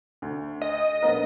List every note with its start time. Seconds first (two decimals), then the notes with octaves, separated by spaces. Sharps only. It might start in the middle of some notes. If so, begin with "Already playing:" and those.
0.22 D2
0.62 D#5
1.02 A#1 B3 A#4